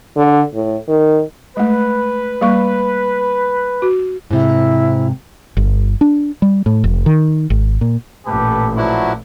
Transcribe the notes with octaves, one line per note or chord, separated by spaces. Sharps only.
D3
A2
D#3
G#3 A3 B4
G3 A#3 C#6
F#4
G#2 C3 E4
G1
D4
G3
A2
F1
D#3
G#1
A#2
A1 A#2 G4 A4 B4
F3 F#3 D4 E4 F#4 B4